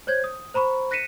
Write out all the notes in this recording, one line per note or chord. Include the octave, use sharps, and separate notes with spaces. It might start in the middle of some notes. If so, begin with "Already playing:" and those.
C5 C#5 G6 G#6
D#6
C5 A#5 B5 C#6
F#6 A#6 B6 C#7 D#7 E7